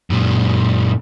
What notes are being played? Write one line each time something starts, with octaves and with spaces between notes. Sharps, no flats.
F#2 A#2